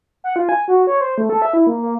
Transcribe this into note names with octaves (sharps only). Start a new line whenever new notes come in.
F#5
F4
G#5
F#4
C#5
C5
A3
A4
E5
E4
A#3
A#3